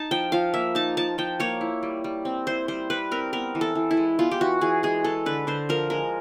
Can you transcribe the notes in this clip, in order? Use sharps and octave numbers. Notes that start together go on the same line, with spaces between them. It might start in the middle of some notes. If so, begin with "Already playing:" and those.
Already playing: D#4 A5
F3 G5
F3 F5
A#3 E5
D#4 A5
F3 A5
F3 G5
A#3 C#5
E4
G3
G3
C4
E4 C5
G3 C5
G3 B4
C4 A#4
B3 A#4
E3
A4
E3
E4
G#3
B3 F4
G4
E3 F#4
E3 G#4
G#3 G#4
G#3 A4
D3 B4
D3 C5
F3 A#4
G#3 A#4